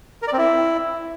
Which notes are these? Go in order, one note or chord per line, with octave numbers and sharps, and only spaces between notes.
A#4
D5
C4
E4